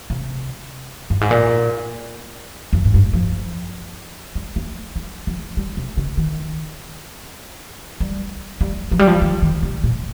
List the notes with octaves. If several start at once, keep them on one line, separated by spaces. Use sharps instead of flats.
C3
G2
G#2
A#2
F2
G#2
G2
F3
G3
A#3
G3
F3
G3
C3
C#3
D#3
G3
G3
F3
G3
F3
D#3
D#3
C3
A#2